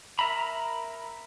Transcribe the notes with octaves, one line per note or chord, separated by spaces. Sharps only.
A#4 E5 A#5 B5